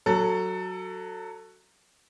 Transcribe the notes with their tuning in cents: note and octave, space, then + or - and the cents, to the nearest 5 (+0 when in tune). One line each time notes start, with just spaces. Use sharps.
F#3 +0 A4 +20